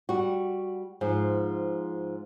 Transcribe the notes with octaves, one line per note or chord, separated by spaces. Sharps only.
G3 F#4
G#2 F3